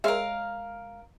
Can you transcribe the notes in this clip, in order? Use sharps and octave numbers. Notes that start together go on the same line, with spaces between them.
G#3 A#4 C#5 E5 F5